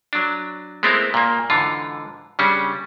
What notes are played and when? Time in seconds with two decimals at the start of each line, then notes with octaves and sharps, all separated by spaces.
0.13 F#3 D4
0.83 G#3 A3 B3 C4 E4 A#4
1.14 A#2 A#3
1.50 G#2 D3 E3 F4
2.39 C#3 G3 C#4 D4